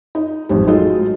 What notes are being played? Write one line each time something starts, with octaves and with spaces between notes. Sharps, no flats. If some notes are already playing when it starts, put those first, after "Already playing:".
D#4
A1 F2 G#2 G3
F#3 G#3 D#4 F4 A4 D#5